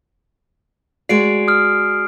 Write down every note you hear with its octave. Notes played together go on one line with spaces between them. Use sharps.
G#3 F#4 D5 C7 D7
D#6 F6